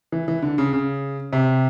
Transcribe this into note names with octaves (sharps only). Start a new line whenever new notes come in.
E3
E3
D3
C#3
C#3
C3